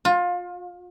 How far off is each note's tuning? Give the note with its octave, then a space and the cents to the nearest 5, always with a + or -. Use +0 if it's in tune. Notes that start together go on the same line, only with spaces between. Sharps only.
F4 +25